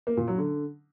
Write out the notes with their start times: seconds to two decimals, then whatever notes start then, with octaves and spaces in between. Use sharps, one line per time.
0.07 A#3
0.17 A#2
0.28 F#3
0.38 D3